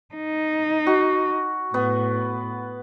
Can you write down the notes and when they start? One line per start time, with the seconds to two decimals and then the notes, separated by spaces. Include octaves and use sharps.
0.15 D#4
0.87 F#4
1.74 A2 B3